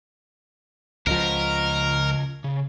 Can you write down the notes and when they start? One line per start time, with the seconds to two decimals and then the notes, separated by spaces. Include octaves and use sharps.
1.07 C#2 C#3 F3 A#4 D#5 F#5
2.44 C#3